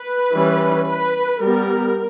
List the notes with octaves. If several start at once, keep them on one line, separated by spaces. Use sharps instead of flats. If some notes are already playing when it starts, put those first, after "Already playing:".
Already playing: B4
E3 G3 C#4
B4
G3 B3 A#4